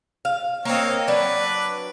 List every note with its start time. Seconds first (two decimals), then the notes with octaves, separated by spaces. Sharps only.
0.25 F5
0.65 A#3 C4 C#5 D#5 F5
1.08 F#3 D4 B4 D6